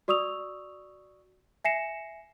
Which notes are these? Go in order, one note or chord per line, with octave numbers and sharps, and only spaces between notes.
F#4 D5 C#6 D#6 E6 F7
E5 G#5 A#6 C7 C#7 E7